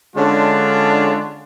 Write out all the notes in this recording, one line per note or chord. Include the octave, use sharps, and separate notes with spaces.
D3 G#3 C#4 D4 F4